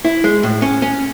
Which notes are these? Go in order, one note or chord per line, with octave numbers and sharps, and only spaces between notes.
E4
G#3
A2
C#4
C#4